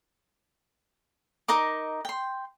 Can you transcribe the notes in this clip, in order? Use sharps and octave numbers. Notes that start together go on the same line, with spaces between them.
D#4 A#4 D#5 D6
G5 C6